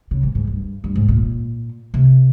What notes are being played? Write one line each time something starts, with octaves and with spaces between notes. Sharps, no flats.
C#3
G#2
G#2
G2
G2
G#2
A#2
C3